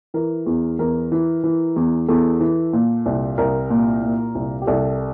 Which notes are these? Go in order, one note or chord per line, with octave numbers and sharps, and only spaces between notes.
E3 A#4
E2
E2 A#4
E3
E3
E2
E2 A4
E3
A#2
C2
C2 A#4
A#2
A#2
C2
G4
C2 A4